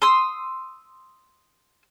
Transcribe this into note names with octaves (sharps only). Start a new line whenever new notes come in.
C6 D#6 E6